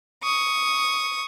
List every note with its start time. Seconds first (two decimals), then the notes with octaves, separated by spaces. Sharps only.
0.23 C#6 D#6